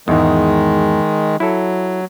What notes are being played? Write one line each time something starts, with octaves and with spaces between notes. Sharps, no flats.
E2 G#2 D#3 G#3
F#3 E4 A4